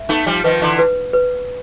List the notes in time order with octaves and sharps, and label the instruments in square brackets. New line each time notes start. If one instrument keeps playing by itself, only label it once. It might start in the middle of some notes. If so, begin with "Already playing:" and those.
Already playing: [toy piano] E5
[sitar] A3 B3 [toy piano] D#4
[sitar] F3 G3
[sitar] D#3 F3 [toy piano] B4
[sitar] D3 E3
[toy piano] B4
B4